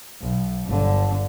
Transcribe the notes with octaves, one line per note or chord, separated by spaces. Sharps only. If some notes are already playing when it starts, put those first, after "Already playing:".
B1
G1 D3